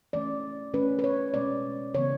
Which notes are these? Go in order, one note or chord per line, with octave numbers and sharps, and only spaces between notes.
E3 A3 C#4 D5
E3 A3 C#4 B4
B4
C#5
B2 G#3 C#4 D5
C#3 E3 B3 C#5